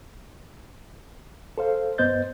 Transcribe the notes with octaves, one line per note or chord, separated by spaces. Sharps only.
A4 C5 F5
G2 B3 C5 D#5 G6 A6